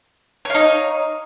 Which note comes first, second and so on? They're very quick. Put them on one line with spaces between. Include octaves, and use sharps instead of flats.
C#5 F5 D#4